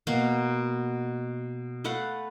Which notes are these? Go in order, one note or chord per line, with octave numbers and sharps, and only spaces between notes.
B2 A#3 F#4 F5
A3 B4 F5 F#5